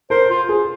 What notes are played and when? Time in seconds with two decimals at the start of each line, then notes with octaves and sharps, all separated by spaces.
0.10 A#4 C5
0.30 F4
0.49 G#4